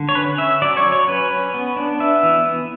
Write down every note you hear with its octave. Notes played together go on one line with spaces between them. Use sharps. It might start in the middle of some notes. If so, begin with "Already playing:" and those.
Already playing: D3
C#5
C#4 B4
C#4 E5
F#3 D5
C#5
F#3
C#5
C#4 B4
C#4
B3
D4
B3 E5
E3
B3